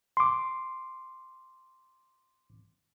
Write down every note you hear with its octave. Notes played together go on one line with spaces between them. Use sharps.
C6 D6